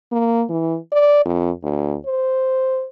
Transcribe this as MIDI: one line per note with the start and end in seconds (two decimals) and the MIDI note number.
0.12 0.44 58
0.49 0.76 52
0.92 1.23 74
1.25 1.51 41
1.63 1.96 38
2.06 2.86 72